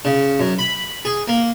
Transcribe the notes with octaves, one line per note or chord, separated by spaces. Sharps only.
C#3
F#2
B5
G#4
A#3